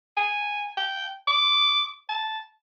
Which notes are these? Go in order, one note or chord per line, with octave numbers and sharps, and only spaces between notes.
G#5
G5
D6
A5